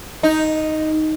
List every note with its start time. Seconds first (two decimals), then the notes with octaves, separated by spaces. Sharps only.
0.23 D#4